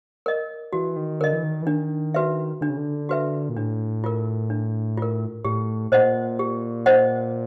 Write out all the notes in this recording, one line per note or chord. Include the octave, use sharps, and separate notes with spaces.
A#4 D#5
E3 F#4
D#3
D3 A#4 D#5
E3
D#3
E3
D#3 D4
F#4 B4 E5
D3 D4
C#3
D3
F#4 B4 E5
A#2
A2 D4
F4 A#4
D4
F4 A#4
A2 G4
A#2 C5 D#5 F#5
G4
C5 D#5 F#5